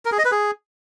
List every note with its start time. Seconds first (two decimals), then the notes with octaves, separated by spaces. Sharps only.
0.05 A#4
0.12 G#4
0.18 D#5
0.25 B4
0.32 G#4